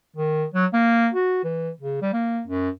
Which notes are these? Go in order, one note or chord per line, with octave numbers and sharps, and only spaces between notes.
D#3
F#3
A#3
F#4
E3
C#3
G3
A#3
F#2